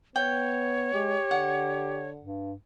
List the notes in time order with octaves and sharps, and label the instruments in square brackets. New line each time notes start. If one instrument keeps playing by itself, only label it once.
[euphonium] B3 [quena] C#5 [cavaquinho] G5
[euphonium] G#3 [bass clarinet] G4
[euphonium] D3 [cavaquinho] F#5
[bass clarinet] G2